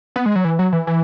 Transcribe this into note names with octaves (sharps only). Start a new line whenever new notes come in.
B3
G#3
F#3
E3
F#3
E3
E3